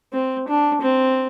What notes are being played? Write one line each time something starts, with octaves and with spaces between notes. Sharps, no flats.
C4
D4
C4